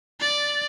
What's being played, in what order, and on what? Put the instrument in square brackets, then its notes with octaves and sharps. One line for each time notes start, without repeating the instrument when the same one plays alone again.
[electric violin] D5